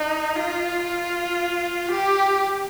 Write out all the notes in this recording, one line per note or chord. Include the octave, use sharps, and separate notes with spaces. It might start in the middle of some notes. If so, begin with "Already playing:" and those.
Already playing: D#4
F4
G4